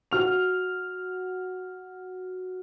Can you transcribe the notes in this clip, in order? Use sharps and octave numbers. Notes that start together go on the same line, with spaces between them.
F#4 F6 F7